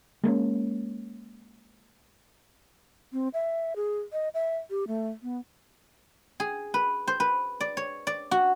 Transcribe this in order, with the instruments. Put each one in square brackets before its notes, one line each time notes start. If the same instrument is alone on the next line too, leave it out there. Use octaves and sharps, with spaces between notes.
[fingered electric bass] G#3 A#3 B3 C#4
[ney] C4
E5
G#4
D#5
E5
G4
A3
B3
[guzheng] G#4
B4
C5
B4
D5
C#5
D5
F#4